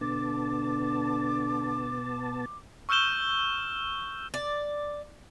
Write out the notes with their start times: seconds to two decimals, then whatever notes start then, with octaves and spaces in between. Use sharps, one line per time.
0.01 B2 D3 B3 A5 D6
2.89 C#6 E6 F6 G6 E7 G7
4.34 D5